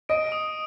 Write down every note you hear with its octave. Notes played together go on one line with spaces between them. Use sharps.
D#5 D7
D#6